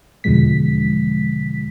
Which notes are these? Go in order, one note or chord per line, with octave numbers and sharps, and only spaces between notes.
E2 B2 D3 F3 G#3 B6